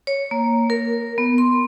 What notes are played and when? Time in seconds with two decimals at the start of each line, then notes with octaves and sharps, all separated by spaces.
0.07 C#5
0.31 A#3
0.70 A#4
1.18 B3
1.38 C6